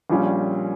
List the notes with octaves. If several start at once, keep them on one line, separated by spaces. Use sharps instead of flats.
A#1 A#2 G3 C#4